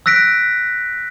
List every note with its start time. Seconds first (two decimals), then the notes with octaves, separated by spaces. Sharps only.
0.06 E6 F#6 A#6 B6 D7